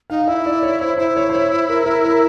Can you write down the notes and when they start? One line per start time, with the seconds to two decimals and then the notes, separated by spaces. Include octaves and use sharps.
0.10 D#4 F5
0.28 E4 E5
0.46 D5
0.63 C#5
0.81 C5
0.98 E4 C5
1.17 C#5
1.29 C5
1.34 C#5
1.69 A#4
1.86 A#4
2.05 A#4